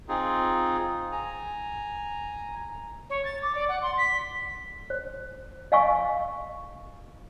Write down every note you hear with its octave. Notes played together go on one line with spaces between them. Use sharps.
C4 D#4 F4 G#4
G#5 A#5
C#5
A6
D6
D5
F#5
C6
B6
C5
D#5 F5 G#5 C#6